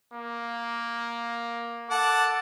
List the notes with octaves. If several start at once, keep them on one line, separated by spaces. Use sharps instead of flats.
A#3
A4 F#5 A5 D6